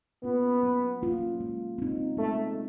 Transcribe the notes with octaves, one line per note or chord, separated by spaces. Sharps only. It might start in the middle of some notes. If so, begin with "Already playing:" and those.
A#3 B3 C#4 F4
F#3
A#3 C#4 F4
G#3
C4 D#4
G#3 A3